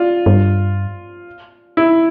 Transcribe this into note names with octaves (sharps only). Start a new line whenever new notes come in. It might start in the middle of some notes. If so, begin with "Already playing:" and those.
Already playing: F4 D5
G2
E4